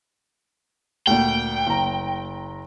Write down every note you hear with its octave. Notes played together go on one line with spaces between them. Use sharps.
D2 A#2 G5
F#1 A#5